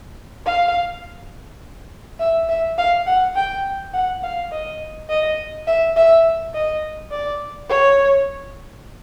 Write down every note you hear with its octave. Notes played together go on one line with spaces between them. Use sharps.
F5
E5
E5
F5
F#5
G5
F#5
F5
D#5
D#5
E5
E5
D#5
D5
C#5